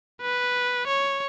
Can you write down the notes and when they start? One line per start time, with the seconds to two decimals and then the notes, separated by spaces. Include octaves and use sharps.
0.22 B4
0.88 C#5